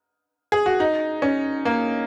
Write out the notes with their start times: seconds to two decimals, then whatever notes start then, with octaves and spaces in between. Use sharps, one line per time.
0.52 G#4
0.66 F#4
0.80 D#4
1.22 C#4
1.65 A#3